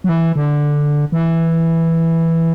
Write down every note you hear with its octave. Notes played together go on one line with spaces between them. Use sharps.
F#3
E3
D3
E3